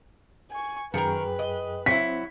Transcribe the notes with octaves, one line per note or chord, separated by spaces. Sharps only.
G#5 C#6
F#2 D#3 G#4 A#4 B4 G5
D#5
F#3 C4 E4 B6